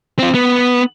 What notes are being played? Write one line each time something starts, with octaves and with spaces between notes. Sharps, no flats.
C4 F4
B3